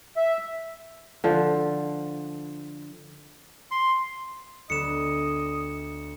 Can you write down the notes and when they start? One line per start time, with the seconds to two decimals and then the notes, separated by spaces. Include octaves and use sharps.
0.17 E5
1.24 D3 F3
3.71 C6
4.70 D2 B3 D#5 C#7 E7